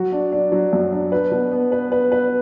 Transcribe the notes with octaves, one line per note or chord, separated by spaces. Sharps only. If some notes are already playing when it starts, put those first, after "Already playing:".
Already playing: F#3 F#4
D4
D4
F#3
F#2
D4
B4
B2
B3
B4
B4
B4